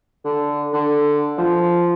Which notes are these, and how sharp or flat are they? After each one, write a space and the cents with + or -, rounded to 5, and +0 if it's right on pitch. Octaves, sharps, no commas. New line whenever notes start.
D3 -5
D3 +5
F3 -5